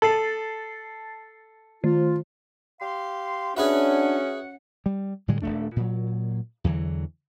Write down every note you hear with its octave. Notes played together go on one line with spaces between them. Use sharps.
A4 A5 A6 C7
D#3 F4
G4 F5 C6
C#4 D4 F#4 G#4 B4 E5 F#5
G3
A2 D3 G3 G#3
D#1 E2 A3 D4
A#2 F#3
E2 D3 E3 F#3